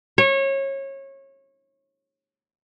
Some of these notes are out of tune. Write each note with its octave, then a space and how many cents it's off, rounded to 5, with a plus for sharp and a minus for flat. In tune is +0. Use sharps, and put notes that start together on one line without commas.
C#5 -25